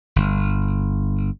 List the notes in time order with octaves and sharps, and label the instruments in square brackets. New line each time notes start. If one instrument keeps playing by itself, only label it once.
[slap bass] G1